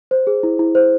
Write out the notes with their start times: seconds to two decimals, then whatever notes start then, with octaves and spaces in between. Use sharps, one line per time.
0.11 C5
0.27 G#4
0.43 E4
0.59 E4
0.75 C5